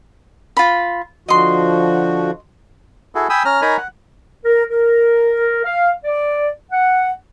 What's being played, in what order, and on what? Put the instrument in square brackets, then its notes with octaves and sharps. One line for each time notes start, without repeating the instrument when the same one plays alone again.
[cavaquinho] F4 B5
[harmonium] D3 F3 F#4 [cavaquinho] D#5 C6
[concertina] E4 F#4 G#4 A4
G5 G#5 B5 D#6 E6
C#4 A#5 F6
D#4 A#4 C#5 G#5 A#5 B5
F#5
[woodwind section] A#4
A#4
F5
D5
F#5